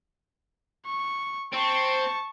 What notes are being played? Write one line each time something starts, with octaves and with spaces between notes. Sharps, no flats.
C#6
C4 A5 C#6